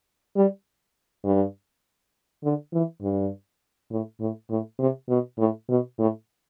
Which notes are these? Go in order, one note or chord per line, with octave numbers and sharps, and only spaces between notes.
G3
G2
D3
E3
G2
A2
A2
A2
C3
B2
A2
B2
A2